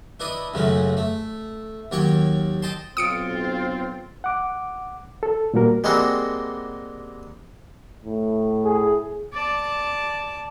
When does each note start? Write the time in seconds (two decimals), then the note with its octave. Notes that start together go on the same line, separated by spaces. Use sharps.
0.20 D4 E4 B4 D#5
0.54 C#2 F#2 C#3 F#3 G#3 A3
0.97 A3
1.91 D#2 F#3 C#5 G5 C#6
2.62 D#5 G5 A5 C6
2.97 B1 C4 F4 D#6 C#7 D7
4.24 F#5 D6
5.23 A4
5.54 A#2 G3 A#3 F#4 A#4
5.84 G3 G#3 A#3 C4 F#4
8.05 A2
8.64 G#4
9.33 D5 A5